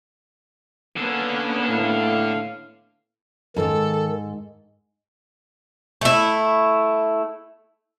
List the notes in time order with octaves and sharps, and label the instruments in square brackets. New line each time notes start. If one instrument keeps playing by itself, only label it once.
[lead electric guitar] D3 A4 [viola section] A#3 B3 C#4
[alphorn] A2 [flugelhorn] F5
[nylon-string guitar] F2 G#2 [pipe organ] D#3 [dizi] A4
[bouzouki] A3 E4